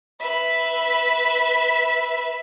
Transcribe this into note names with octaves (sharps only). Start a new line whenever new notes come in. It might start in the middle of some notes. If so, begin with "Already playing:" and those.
B4 E5